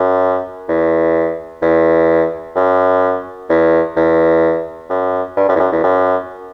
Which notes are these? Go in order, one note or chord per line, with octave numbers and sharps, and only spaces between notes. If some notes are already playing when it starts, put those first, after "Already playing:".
Already playing: F#2
E2
E2
F#2
E2
E2
F#2
G2
F#2
E2
F#2
E2
F#2